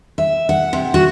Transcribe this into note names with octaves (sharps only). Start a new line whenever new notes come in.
E5
F#5
C3
F#4